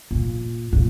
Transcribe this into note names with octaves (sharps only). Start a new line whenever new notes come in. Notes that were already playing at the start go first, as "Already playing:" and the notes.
A#2
A#2